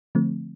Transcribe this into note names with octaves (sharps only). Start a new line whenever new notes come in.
D3 F3 A3 C4